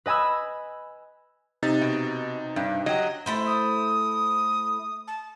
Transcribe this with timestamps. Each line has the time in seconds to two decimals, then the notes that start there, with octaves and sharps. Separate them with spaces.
0.06 B4 D#5 G#5 B5 E6
1.63 C3 D#4 A6
1.81 B2
2.56 G2
2.86 F#3 G4 D#5
3.26 A3 E4 C5
3.47 D#6
5.07 A5